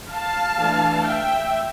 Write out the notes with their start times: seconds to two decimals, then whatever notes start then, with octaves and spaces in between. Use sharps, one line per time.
0.10 F5 A5
0.57 E3 A3 D4
1.02 E5 G5